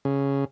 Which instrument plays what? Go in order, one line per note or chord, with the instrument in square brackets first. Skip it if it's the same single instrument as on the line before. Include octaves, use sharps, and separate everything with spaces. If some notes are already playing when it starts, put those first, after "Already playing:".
[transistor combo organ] C#3